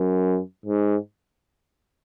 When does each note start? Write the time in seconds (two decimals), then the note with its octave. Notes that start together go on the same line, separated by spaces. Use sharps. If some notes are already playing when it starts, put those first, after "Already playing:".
Already playing: F#2
0.66 G#2